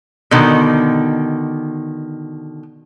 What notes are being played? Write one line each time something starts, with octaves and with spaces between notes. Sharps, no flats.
B2 D3 D#3